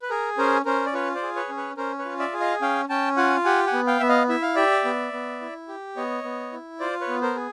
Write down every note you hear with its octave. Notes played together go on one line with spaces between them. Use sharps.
B4
G#4 A#4
C#4 A#4 C5
C#4 A#4 C5
D5
F4 B4 C#5
C5 D5
G#4
B4 C#5
C#4
B4 C#5
C#4 A#4 C5
B4 C#5
F4
D5 E5
G#4
D#5 F5
C#4 F5 G5
C#4 G5 A5
F4 F#5 G#5
G4 F#5 G#5
F#5 G#5
B3
F5 G5
B3 E5
D#5 F5
E4 E5
F5
G4 D5 E5
B3
B3
E4
G4
B3 C#5 D#5
B3
E4
F4 C5 D5
B4 C#5
B3
A#4 C5
G#4